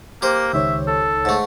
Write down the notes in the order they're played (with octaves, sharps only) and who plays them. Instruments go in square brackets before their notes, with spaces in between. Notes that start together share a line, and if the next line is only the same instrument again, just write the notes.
[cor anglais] A#3 [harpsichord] G4 C5
[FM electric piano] C#2 D#3 C#5 [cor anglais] E5
[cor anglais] A4
[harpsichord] G#2 A3